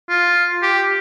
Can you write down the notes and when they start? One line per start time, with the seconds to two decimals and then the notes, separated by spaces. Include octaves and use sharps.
0.09 F4
0.63 G4